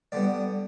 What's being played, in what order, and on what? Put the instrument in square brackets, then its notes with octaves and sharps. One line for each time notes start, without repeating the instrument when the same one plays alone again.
[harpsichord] D3 G3 B3 D5